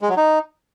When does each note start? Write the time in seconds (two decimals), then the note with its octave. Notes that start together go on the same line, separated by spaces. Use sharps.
0.01 G#3
0.09 F#3
0.17 D#4